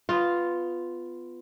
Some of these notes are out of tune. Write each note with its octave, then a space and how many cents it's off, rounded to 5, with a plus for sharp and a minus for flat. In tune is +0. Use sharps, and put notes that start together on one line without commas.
B3 +15 F4 +0